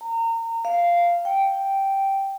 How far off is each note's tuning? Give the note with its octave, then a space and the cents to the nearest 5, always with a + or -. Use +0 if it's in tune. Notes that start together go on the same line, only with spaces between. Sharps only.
A#5 -30
F5 -10
G5 -5